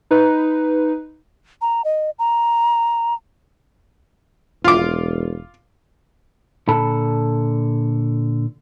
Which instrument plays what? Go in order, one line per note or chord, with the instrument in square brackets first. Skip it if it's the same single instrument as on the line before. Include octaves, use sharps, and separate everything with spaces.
[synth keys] D#4 B4
[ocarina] A#5
D#5
A#5
[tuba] E1 [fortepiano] F4 D6
[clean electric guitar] A#2 D3 A4 A5 B5